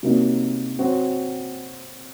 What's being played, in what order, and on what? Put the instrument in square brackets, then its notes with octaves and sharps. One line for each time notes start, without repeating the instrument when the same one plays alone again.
[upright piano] C3 F#3 A#3 D#4
F#3 C4 F#4